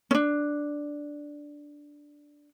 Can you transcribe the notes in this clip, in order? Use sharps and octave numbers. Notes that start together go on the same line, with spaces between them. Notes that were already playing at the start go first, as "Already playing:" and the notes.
C#4 D4